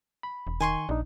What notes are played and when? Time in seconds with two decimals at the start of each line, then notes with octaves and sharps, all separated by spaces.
0.23 B5
0.47 E1
0.60 D#3 G#5 C6 C#6
0.89 A#1 D4 D#4